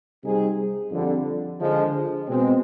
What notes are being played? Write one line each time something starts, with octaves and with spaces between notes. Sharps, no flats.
C3 G3 C4 D#4 G#4
F2 D3 G3
D3 F3 G#3
B2 G#3 C4